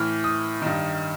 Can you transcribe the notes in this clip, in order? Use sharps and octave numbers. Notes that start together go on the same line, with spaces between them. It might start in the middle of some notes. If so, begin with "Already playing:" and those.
Already playing: A2 E3 F6
D#6
G2 D#3